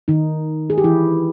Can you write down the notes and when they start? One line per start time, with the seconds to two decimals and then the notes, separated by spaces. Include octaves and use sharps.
0.08 D#3 D#4
0.70 G#4
0.78 G4
0.84 E3 E4